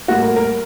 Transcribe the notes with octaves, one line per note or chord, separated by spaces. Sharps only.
A2 G3 A#3 F#4
A#4
A#4